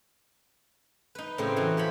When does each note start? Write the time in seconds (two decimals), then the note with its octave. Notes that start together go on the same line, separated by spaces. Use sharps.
1.15 D#4 B4
1.38 A2 C#3 C4 A#4 G5
1.56 E3 D#4 F#4
1.77 F3 C5 C#5 B5